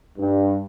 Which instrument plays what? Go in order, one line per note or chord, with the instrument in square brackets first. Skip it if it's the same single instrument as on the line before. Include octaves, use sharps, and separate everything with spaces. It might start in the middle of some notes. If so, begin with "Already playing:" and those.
[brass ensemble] G2